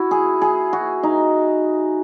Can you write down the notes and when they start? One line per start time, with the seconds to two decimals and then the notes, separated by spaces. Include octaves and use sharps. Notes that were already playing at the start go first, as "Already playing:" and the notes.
Already playing: E4 F#4
0.11 G#4
0.42 G#4
0.73 F#4
1.03 D#4